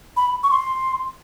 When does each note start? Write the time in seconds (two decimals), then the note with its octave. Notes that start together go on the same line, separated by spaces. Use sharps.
0.17 B5
0.43 C#6
0.51 C6